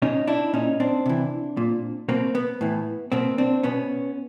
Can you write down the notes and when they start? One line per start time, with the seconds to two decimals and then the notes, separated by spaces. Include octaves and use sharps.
0.02 B2 C#4 D#4
0.27 D4 E4
0.53 A#2 C#4 D#4
0.80 C4 D4
1.06 C3 E3
1.57 A#2
2.09 B2 A#3 C4
2.35 B3
2.61 A2 E3
3.12 B2 A#3 C4
3.38 C4 D4
3.63 B2 B3 C#4